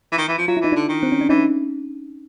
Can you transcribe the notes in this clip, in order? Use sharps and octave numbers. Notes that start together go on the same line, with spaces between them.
E3
D#3
E3
F3
F#3 F4
E4
E3 D#4
D3 D4 E4
D#3
C4
C#4
D4
E3 C#4 D#4